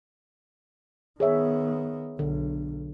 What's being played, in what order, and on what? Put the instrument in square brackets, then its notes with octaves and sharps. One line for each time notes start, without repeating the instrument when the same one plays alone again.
[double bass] D#3 B3 [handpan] G#4 C#5 E5
[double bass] B1 [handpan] D3